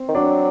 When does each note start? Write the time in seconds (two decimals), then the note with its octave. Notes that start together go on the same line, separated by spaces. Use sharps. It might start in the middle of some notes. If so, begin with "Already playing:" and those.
Already playing: C4
0.08 D#3
0.15 F#3 D4